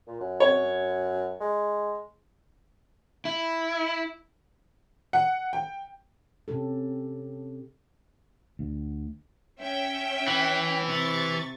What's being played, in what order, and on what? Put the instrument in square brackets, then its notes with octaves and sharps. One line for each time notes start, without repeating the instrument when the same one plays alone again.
[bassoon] A#2
F#2
[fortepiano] C#5
[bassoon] G#3
[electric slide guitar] E4
[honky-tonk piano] F#5
G5
[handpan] C3 C#4 G4 A4
[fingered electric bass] D2
[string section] C#4 E5 G5
[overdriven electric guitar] E3
[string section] C3 C#6 A6